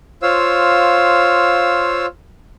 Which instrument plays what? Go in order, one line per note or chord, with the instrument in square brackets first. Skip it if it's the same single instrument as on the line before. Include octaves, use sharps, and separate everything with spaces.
[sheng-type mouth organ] F4 C5 C#5 F5 E6